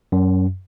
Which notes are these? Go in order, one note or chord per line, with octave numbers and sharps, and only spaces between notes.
F#2